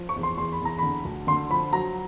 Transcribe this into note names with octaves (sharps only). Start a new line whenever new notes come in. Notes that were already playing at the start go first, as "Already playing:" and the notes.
Already playing: F3
C#6
E2
C6
E2 C6
B5
E2 A#5
D3 B5
D2
D3 C6
F3 B5
F#3 A#5